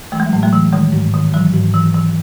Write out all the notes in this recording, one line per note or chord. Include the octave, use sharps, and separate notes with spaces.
E3 A3
G#3
F#3
A2 G#3
F#3 A3
E3
D#3 G#3
G#2
D#3
E3 F#3
G#2
E3
E3